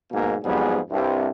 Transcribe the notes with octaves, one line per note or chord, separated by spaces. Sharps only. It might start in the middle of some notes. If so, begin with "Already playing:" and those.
B1 G#2 B2 A#3
F2 G#2 F#3 G3 B3 G#4
C2 G2 C3